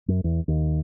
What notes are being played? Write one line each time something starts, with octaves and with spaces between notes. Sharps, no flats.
F#2
E2
D#2